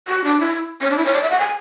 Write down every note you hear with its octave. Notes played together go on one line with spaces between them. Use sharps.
F#4
D4
E4
C#4
D4
E4
C#5
D5
E5
F#5
G#5